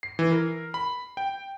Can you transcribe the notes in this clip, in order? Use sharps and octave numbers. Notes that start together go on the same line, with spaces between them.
C7
E3
A#4
B5
G5